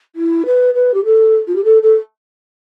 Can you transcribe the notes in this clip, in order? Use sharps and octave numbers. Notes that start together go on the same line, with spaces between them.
E4
B4
B4
G4
A4
F4
G4
A4
A4